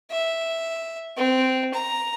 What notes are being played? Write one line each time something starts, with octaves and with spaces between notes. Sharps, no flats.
E5
C4
A#5